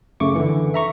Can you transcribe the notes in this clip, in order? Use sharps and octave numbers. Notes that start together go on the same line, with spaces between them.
F#2 C#3 A3 C#6 D6
D3 E3
E5 A#5 C#6